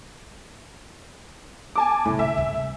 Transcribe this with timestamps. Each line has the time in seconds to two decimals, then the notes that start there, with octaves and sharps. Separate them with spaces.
1.76 G#5 A5 D6
2.05 F#2 A2 C3
2.19 A#2 C#3 E5
2.34 G1 D2
2.53 C2